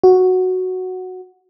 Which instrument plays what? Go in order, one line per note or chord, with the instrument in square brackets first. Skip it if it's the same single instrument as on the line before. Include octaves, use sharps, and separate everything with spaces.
[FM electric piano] F#4